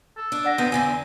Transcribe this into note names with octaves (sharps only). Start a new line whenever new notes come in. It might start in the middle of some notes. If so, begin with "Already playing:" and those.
A4
D4
D5 F#5 A#6
E2 B3 C4
E2 D3 C4 G#5